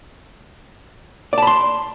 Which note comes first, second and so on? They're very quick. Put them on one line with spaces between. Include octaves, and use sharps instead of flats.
D5 A5 B5 C6